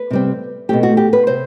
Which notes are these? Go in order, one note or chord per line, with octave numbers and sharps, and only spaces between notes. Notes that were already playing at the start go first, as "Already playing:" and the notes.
Already playing: B4
C3 G3 C4
B2 A3 C4 G4
F#4
G4
B4
C3 C5